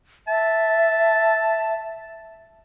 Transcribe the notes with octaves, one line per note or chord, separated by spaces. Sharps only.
E5 A5